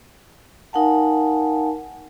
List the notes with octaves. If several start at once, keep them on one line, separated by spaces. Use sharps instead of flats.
D#4 A#4 F5 F#5 G#5 A5